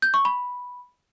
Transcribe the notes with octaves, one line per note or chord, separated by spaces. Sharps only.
G6
C#6
B5